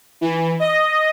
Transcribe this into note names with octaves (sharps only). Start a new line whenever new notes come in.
E3
D#5